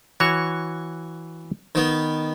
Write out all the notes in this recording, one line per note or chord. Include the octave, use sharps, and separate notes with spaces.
E3 F#4 C#5 C#6
D#3 B3